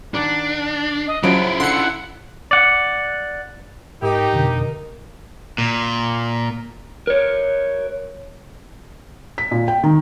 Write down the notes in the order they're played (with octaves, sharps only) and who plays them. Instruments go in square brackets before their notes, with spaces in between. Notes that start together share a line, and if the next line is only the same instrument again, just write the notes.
[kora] D#3 D5 F#5 [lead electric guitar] D4
[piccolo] D#5
[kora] C#3 F3 F#5 [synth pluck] F#3 [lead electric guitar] E4 F4 [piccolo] D7
[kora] D3 E5 [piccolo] F#5 [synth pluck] C6 C#7
[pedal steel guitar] D5 F#5
[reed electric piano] G#2 [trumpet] D#4 [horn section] G4 [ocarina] A#4
[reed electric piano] F2 B2 D3
[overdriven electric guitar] A#2
[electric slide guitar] A#4 C#5
[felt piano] B6
A#2
G5
D#3